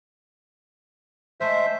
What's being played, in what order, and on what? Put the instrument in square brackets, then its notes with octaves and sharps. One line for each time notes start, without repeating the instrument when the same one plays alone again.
[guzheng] G#3 A3 [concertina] C5 E5